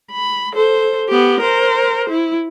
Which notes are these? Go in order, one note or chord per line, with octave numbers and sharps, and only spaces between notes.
B5
A4 C5
B3 G4
A#4 C5
E4